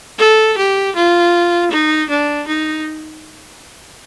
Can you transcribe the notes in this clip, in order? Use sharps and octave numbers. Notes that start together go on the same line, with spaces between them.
A4
G4
F4
D#4
D4
D#4